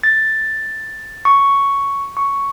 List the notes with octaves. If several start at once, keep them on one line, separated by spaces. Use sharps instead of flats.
A6
C#6
C#6